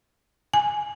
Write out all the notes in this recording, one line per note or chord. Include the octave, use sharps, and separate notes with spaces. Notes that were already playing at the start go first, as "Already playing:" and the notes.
G#5